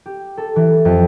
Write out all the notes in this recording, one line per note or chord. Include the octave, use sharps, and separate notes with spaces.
G4
A4
E3
F2